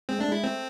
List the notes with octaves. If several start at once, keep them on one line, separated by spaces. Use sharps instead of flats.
G#3 C4
A3 D4
G#3 E4
A3 C4